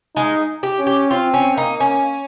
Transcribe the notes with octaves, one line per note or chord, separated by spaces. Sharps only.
G#3 D#4
G4
C#4
G4
C4 F4
C#4
A#3 D#4
C#4